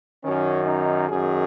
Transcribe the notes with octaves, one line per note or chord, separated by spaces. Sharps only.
F#2 D#3 C#4
D#4
F#2 D#3 G#4